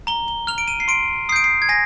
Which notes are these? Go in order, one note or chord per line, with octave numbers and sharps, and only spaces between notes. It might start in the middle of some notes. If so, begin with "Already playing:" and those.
A#5 G7
G7
F6 F7
D7
D#7
C7
C6 D7
D#6 G6 C7 D7
C7
G#6
G#5 A#6